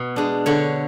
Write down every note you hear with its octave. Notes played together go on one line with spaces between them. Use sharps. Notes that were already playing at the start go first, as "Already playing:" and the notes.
Already playing: B2
G#3 D4
D3 C#5